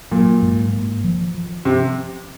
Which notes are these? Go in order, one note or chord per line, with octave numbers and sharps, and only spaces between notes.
A#2 F#3
G#2
A#3
F3
F3
C3